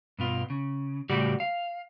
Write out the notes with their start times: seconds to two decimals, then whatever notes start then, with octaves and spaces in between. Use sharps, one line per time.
0.19 G2 B2 F4
0.50 C#3
1.10 A2 C#3 G3 F#4 G4 D5
1.40 F5